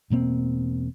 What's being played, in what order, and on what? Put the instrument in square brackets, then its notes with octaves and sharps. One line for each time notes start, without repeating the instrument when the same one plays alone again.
[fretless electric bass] E1 B2 A#3 C4